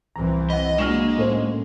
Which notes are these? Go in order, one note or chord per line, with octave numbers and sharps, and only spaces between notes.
C2 E3 C4 A#5
D#5 F#5 B5
F#3 G#3 A#3 D4 C#6 F6 A#6 E7
A2 C#4 A4 C5